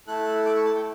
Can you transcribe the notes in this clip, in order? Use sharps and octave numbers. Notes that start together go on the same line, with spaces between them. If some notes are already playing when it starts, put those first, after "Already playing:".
A3 E4 A4 F#6
D6
C#6
A5
G5